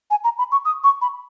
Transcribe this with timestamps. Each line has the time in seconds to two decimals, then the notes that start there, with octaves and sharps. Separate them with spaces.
0.11 G#5
0.24 A#5
0.38 B5
0.52 C#6
0.65 D#6
0.84 C#6
1.01 B5